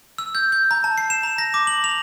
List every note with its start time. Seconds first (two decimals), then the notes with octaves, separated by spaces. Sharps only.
0.18 E6
0.35 G6
0.52 G6
0.71 A#5
0.84 A5
0.98 C7
1.10 E7
1.23 A#5
1.38 A#6
1.54 D6
1.67 F#7
1.84 F7